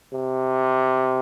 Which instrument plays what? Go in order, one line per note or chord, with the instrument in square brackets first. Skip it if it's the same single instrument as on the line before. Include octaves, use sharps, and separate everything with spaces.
[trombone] C3